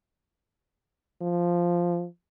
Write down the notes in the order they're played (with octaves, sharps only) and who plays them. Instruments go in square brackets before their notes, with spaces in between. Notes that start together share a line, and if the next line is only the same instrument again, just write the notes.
[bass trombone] F3